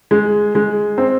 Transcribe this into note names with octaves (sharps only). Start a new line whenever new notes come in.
G#3
G#3
C4